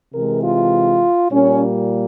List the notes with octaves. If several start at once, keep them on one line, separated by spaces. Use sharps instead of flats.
C3 E3 G#3 A#4
F4
A#2 G3 A#3 C#4